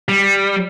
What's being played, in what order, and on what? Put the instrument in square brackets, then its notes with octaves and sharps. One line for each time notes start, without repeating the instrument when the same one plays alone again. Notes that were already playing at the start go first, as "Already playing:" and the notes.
[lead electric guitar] G3